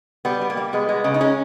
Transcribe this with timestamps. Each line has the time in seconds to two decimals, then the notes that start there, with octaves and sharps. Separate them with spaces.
0.25 G3 B3
0.42 G3
0.50 A#3
0.57 G3
0.73 G#3 B3
0.89 G#3
1.04 C#3
1.14 D#4
1.21 G#3 C#4